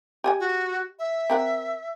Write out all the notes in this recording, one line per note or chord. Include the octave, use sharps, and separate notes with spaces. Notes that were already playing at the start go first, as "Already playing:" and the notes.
G4 D#5 G#5
F#4
E5
C4 A#4 F#5